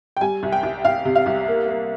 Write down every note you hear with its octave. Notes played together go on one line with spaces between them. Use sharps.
G5
G3 G#5
C2
G5
C2
C2 F5
C3
F5
C2
A#3
A#3